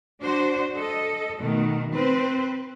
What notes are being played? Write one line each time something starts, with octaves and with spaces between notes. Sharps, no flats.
D4 F#4 C5
A4 D#5
B2 D#3 A3
C4 B4 C5